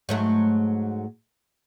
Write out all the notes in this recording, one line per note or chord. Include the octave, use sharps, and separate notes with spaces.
G#2 F#3 A3